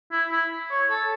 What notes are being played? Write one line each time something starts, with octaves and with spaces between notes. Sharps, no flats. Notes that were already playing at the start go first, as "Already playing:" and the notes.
E4
E4
C#5
A4